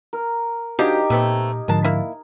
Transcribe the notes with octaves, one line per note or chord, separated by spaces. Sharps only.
A#4
F3 D4 D#4 F#4 G4 G#5 A#5
A#2 A3 B3 C4
G#2 D3 F3 A#4 A5
A#3 E4